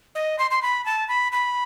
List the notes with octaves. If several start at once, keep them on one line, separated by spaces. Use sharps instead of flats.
D#5
C6
C6
B5
A5
B5
B5